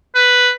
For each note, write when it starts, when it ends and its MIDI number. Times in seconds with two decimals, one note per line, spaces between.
0.15 0.51 71